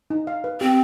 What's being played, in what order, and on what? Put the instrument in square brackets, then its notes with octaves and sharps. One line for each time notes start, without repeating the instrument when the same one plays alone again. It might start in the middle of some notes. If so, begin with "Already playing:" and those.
[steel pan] D#4
F5
B4
[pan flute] C4 [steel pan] G4